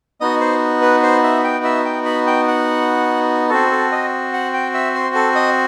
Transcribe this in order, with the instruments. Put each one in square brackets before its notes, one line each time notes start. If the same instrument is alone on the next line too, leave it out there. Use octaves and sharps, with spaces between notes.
[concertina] B3 D#4 F#4 D#5
C5
B4
C5
E5
G5
E5
G5
B5
G5
F#5
C4 F#4 A4
A4
D#5
F#5
G5
E5
C5
A4
D#5